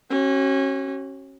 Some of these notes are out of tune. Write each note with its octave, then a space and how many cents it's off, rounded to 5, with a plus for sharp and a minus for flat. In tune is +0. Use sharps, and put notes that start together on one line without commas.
C#4 -30 F#4 +35